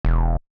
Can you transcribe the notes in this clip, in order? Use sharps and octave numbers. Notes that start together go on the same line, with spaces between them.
E1